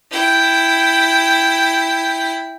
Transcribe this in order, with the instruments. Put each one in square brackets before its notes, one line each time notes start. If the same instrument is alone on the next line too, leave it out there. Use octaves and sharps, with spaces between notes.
[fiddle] E4 G5